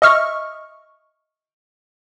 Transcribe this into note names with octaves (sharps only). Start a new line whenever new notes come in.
D#5 E5 C#6 F6